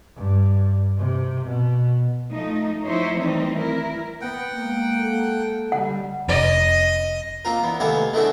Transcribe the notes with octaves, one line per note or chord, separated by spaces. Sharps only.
G2
C3
B2
F3 A3 D#4
F3 F#3 D#4 E4 C5 C#5
D#3 E3 G3 A3 C4 D#4
E4 A#4
B3 F#5 G5
G#3 A#3
A4
D3 G3 F#5
F1 F2 D#5
A#3 C4 F4 A#4
E2 B3
D#2 C3 A3 B3 F5 G#5
G#3 A3 B3 D4 E4 F#4